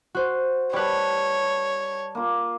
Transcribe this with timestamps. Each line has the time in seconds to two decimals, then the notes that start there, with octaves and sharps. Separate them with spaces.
0.15 F#4 C5
0.73 G3 G4 B4 C#5 A5
2.15 A#3 F4